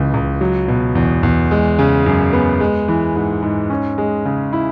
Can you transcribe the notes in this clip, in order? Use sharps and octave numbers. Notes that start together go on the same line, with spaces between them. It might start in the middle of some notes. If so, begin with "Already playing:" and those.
Already playing: C#2 C#3 E3
C#2
F#3
B2
E2
E2
G#3
C#3
F#2
B3
G#3
E3
G#2
G#2
C#4
G#3
C#3
E4